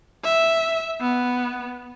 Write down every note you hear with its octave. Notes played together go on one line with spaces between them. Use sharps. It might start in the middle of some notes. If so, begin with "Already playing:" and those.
E5
B3